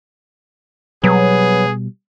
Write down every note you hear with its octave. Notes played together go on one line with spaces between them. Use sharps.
B2 F#3 G3 B3 G#4